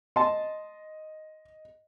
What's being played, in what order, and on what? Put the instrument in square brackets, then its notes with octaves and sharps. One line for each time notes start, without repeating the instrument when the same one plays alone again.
[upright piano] D#5 [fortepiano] A5 C6